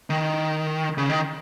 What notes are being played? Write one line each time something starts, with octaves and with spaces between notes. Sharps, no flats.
D#3
C#3
D#3